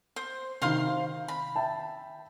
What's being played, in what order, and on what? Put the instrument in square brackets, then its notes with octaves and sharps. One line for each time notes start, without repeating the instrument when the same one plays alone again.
[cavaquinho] C5
[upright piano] C3 D#3 [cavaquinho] C5 F5 C6
[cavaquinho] B5
[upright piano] E5 G5 A5